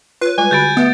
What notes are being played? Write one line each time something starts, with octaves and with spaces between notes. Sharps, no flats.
F4 B4 C#5
G3 G#3 F4 G#5
D3 F#4 B5 G6 A6 D7
A3 B3 B4 E5